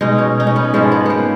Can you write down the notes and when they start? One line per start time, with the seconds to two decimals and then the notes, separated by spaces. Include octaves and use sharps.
0.01 B2 G#3 D#4
0.18 C#4
0.40 D#4
0.47 C#4
0.56 B3
0.74 G#2 F3 G#3 C#4
0.92 B3
1.06 A#3 B3